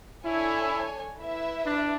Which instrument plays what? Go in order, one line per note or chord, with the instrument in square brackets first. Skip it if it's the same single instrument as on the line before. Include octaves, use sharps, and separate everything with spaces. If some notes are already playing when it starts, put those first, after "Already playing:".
[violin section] D4 A4 C#5 G#5 [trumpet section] E4
[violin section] E4 B4 E5
[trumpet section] D4